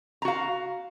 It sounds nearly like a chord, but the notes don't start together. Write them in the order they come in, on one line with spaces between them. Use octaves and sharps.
A#5 F#4 F5